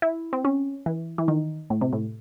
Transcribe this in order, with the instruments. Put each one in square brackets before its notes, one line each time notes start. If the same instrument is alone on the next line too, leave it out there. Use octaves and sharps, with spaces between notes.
[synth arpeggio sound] E4
C4
C#4
E3
E3
D#3
A2
C3
A2